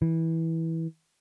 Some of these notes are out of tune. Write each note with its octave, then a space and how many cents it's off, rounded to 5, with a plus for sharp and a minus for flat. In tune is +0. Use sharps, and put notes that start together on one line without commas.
E3 -15